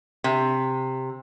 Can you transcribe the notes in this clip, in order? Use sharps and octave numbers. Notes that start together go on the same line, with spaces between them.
C3